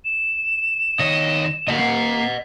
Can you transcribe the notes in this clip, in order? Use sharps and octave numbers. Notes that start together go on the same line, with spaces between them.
E7
D#3 C#5 D#5
D2 A#3 D#5 F#5
A#3